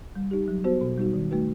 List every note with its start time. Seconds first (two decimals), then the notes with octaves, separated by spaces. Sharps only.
0.16 G3
0.31 D#4 G4
0.48 F#3
0.64 B3 F#4 C5
0.81 B2
0.98 G3 D#4 F#4
1.14 D#3
1.31 A3 D#4 F#4 B4